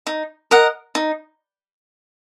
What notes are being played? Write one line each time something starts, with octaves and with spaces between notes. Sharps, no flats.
D#4
A#4 D#5 F#5
D#4